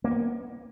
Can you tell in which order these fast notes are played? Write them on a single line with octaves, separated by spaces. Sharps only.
A#3 C#4 B3